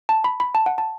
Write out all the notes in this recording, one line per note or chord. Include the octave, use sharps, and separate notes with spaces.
A5
B5
B5
A5
F#5
A5